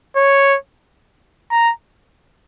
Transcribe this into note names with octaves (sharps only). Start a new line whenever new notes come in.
C#5
A#5